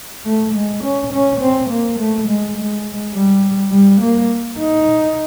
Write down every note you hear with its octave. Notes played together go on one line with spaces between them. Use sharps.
A3
G#3
C#4
C#4
C4
A#3
A3
G#3
G#3
G3
G3
A#3
D#4